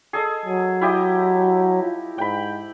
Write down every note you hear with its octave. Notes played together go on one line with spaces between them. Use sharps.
G#4 A4 D#5
F#3
E4 G4 D#5
F4
G#2 G5 B5